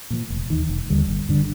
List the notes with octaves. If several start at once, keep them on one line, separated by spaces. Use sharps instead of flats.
A#2 F3
F1
D#2 D#3
F1
D#2 D3 G3
G1
G2 D3